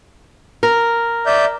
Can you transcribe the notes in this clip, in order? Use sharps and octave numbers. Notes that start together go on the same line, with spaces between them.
A#4
D5 E5 G6